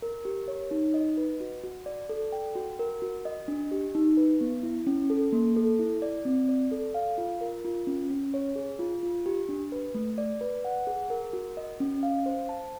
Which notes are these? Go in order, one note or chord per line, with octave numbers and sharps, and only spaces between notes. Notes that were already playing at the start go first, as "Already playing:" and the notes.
A#4
G4
C#5
D#4
D#5
B4
F#4
F#4
D5
A4
G5
F#4
A#4
F#4
D#5
D4
G4
D#4
B4
B3
E4
C#4
A4
A#3
A4
E4
D5
C4
D5
A4
F5
F4
A#4
F4
C#4
C#4
C#5
G#4
F4
F4
G4
D4
B4
A3
D5
B4
F#5
G#4
A#4
F#4
D#5
C#4
F5
C5
A5